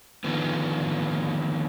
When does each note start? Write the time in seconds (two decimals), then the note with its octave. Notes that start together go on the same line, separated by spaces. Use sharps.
0.24 D3 D#3 F3 B3